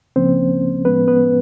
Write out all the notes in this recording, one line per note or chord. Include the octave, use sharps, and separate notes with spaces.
C#2 C#3 F3 A#3 C4 C#4 C5
A2 F3 G#3 B3 C#4 B4
B3 B4